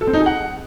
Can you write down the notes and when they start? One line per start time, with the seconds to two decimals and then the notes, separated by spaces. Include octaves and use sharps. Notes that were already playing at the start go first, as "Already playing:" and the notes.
0.01 A4
0.07 C4
0.13 D#4
0.20 G#4
0.26 F#5